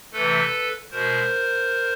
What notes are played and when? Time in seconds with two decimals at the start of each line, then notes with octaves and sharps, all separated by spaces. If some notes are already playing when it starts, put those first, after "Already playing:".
0.13 C3 E3 A3 A4 B4
0.91 B2 G#3 A#4 C5